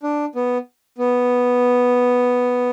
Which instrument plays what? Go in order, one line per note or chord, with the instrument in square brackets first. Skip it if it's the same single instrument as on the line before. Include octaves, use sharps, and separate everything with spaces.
[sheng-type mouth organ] D4
B3
B3